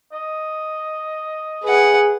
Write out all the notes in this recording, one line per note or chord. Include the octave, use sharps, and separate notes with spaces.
D#5
G#4 B4 F#5